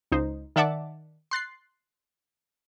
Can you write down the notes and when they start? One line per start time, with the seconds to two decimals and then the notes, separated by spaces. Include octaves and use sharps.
0.12 C#2 D#4 C5
0.56 D#3 D5 E5 F#5 A5 D6
1.31 C6 F#6 A6 C7